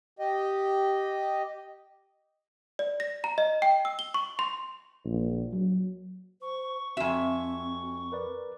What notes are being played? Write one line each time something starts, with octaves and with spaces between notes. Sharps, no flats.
G4 D#5
D5
A#6
A#5
D#5
G5
E6
G7
C#6
C6
A#1
F#3
C5 C#6
F2 C4 F#4 E5 G#5
A#4 B4 D5